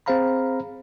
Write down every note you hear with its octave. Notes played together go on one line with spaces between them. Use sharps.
C4 G#4 C5 F5 A#5 B5